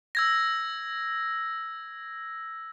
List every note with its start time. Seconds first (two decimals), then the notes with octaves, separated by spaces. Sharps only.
0.15 E6 G#6 A#6